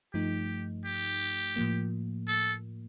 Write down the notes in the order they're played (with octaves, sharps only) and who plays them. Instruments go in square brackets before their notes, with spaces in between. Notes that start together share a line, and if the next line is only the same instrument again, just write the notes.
[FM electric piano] G2 F3 A3 D#4 [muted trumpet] G4
[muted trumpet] G4
[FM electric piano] A2 F3 A#3
[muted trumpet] A4